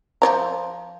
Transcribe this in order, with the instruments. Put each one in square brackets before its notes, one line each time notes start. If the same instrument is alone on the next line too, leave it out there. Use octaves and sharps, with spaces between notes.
[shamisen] F3 D5 A#5